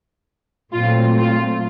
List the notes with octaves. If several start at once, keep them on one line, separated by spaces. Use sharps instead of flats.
A#2 F#3 A3 C4 F4
F4